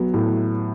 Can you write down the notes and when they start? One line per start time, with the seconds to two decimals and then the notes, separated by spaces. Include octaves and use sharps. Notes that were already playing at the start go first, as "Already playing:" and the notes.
Already playing: F#3 B3
0.14 A2